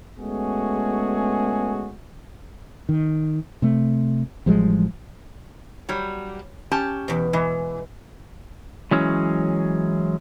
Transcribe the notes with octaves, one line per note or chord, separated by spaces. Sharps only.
G#3 A3 B3 C#4 F#4 G#4
D#3
C3 A3
A1 F3 G3 G#3
F#3 G3 C#5
C#4 G4 A5
E2 B2
E3 G#3
E3 F#3 G#3 C#4